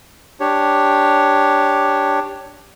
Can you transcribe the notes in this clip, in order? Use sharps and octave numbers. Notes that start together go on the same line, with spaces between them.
D4 G4 C#5